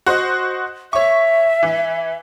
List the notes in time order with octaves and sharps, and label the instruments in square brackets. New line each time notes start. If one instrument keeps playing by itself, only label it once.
[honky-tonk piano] F#4 C5 D#5
[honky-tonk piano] C#5 C#6 [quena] E5
[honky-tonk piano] E3